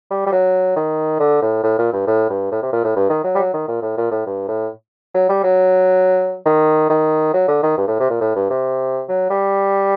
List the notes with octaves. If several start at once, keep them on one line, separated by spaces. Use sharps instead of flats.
G3
G3
F#3
D#3
D3
A2
A2
A#2
G2
A2
G2
A2
C3
A#2
A2
G2
D#3
F#3
G3
F#3
D#3
A#2
A2
A#2
A2
G2
A2
F#3
G3
F#3
D#3
D#3
F#3
D3
D#3
G2
A2
C3
A#2
A2
G2
C3
F#3
G3